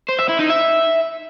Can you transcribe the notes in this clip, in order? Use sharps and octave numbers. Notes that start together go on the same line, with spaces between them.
C5
E5
E4
D#4
E5